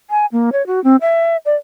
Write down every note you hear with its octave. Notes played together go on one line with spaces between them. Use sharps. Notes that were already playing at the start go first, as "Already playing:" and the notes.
G#5
A#3
C#5
F#4
C4
E5
D5